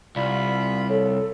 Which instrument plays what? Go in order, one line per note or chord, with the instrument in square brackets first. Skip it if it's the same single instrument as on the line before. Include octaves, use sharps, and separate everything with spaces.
[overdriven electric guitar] C2 [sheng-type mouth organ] F4 B5 [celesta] D5
[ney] A4 [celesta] C#5